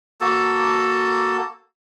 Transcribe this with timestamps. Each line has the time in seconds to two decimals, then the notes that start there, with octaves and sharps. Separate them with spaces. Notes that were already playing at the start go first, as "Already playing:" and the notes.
0.21 A#3 F#4 A4 A5